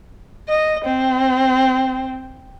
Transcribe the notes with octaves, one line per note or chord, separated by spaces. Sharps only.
D#5
C4